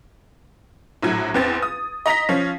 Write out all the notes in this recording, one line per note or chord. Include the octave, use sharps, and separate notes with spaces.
A#1 A2 F#3 G#6
E2 C4 A6
D#6
D#5 A#5 A#6 B6
F3 C#4